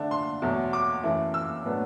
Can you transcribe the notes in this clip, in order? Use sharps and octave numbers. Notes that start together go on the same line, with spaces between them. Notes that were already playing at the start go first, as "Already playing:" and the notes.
Already playing: D3 A3 D4
C6
E2 B2 F#3 A3
D6
F#2 E3 A3 E4
E6
A2 F#3 B3 D4